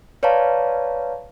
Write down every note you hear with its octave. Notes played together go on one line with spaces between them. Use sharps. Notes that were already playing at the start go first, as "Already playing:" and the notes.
B4 C#5 D5 F5 A5 A#5